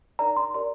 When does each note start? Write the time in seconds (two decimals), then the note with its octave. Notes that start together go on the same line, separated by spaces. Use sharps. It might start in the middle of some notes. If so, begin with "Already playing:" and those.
0.19 D#4 A#4 D5 A#5
0.36 C6
0.54 G4 A#4 D5 C6